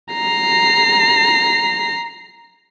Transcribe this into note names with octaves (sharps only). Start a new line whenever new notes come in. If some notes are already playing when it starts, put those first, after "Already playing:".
A#5 C7